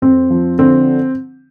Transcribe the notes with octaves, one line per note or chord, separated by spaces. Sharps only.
F2 C4
F3
D3 C4